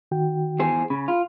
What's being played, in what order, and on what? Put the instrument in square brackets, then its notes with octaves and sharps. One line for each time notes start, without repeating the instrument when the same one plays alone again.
[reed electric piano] D#3 F#4 G5
[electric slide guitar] E2 G#4 C5
[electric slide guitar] C#3 [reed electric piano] B5
[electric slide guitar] F4